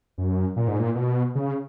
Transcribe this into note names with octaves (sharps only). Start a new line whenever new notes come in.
F#2
A#2
G#2
A#2
B2
C#3